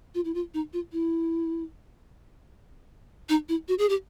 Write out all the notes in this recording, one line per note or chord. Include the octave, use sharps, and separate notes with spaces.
F4
E4
F4
D#4
F4
E4
D#4
E4
F#4
G#4
G4